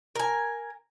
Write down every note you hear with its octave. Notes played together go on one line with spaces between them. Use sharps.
A#4 G#5